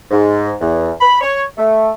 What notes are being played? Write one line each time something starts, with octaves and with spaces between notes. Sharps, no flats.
G#2
E2
B5
C#5
A3